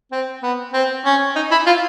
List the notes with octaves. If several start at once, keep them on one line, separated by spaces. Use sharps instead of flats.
C4
B3
C4
C#4
D#4
E4
F4